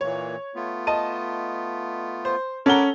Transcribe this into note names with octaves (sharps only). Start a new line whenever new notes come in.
A#2 E3 A#3 C#5
A3 B3 F4
D#5 A5 D#7
C5
C#4 A4 A#4 F#5 A#5 B5 D6 G7